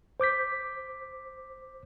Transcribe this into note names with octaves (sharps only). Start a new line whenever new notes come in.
C5 D6 G6 B6